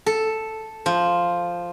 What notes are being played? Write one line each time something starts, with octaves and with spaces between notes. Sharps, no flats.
A4
F3